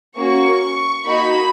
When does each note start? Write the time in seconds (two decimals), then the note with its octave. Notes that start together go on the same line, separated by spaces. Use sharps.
0.15 A#3 C#4 F#4 C#6
1.05 A#3 D#4 F#4 B5